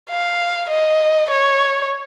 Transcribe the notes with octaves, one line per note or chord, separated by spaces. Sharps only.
F5
D#5
C#5